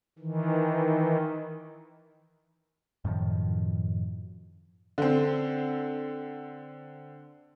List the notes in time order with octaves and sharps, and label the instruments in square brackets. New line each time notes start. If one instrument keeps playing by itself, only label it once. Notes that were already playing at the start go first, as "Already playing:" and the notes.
[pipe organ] D#3 E3
[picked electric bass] F#2 A2 D#3 F3
[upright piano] D3 C4